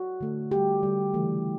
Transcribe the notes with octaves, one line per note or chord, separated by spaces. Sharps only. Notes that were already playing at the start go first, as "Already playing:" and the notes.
Already playing: F#4
D3 A3
D3 G3 G4
D3 G3
C#3 E3 A3